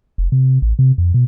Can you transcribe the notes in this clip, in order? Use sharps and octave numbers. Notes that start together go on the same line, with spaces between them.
F1
C3
A1
C3
F2
B2